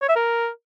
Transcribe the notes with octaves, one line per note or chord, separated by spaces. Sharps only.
C#5
E5
A#4